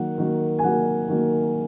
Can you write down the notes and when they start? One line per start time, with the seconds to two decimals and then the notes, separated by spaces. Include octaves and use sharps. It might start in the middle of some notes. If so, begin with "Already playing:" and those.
Already playing: D#3 F#3 A#3 F#5
0.18 D#3 F#3 A#3
0.59 G#5
0.63 D#3 F#3 A#3 F#5
1.08 D#3 F#3 A#3